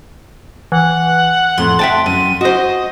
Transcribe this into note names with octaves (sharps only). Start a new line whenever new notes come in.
E3 F#5
F2 A2 C6
E5 G5 A5
F#2 D#7
F#4 C5 D#5